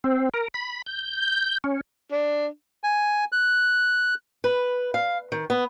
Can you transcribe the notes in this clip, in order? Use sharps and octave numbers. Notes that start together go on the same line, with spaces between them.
C4
A#4
B5
G6
C#4
D4
G#5
F#6
B4
F5
D#3
B3